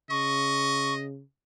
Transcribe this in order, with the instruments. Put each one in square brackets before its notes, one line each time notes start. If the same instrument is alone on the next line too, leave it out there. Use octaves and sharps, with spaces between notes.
[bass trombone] C#3 [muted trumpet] D#5 [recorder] C#6